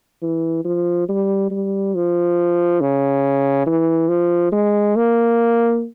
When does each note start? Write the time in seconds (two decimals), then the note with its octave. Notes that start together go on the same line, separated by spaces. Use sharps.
0.22 E3
0.65 F3
1.09 G3
1.51 G3
1.95 F3
2.81 C#3
3.67 E3
4.09 F3
4.52 G#3
4.96 A#3